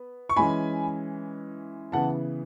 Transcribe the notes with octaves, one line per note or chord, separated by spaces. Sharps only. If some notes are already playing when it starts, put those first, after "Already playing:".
Already playing: B3
C#6
E3 G#3 C#4 G#5 B5
C#3 E3 B3 F#5 A5